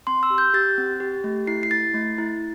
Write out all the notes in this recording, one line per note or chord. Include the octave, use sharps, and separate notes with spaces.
C4 C6
E6
G4
G6
G4 A6
C4
G4
A3
E4 C7
C7
E4 A6
A3
E4